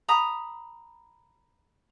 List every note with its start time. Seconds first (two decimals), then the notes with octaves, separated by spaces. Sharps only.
0.09 A#5 B5 D#6